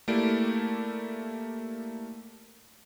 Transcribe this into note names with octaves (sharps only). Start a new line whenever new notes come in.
A3 A#3 E4 G4 D5 D7